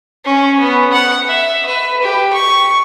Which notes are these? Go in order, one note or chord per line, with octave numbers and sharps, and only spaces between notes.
C#4
B3
F#5
E5
B4
G4
C#6